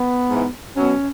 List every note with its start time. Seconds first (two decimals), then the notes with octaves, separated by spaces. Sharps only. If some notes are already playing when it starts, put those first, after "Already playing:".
Already playing: B3
0.28 G#2 E3
0.75 B2 F#3 C#4